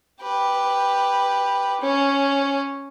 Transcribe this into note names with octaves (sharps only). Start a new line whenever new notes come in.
G4 B4
C#4